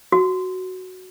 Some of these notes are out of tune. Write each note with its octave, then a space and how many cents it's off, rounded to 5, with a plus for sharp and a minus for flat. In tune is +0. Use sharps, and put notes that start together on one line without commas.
F#4 +0